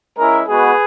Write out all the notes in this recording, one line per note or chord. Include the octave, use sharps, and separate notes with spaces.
G#3 C#4 E4 A#4
G#3 B3 F#4 G#4 B4